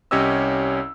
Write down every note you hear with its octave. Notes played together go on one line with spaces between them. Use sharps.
C2 C#4 G4 C#5 D#5 E6